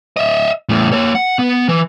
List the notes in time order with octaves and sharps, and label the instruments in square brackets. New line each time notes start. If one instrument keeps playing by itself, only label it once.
[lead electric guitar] D#5 E5
E2 A2
A#3 C#5
F#5
B3
E3